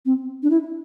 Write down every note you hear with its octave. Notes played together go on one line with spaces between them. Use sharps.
C4
D4
E4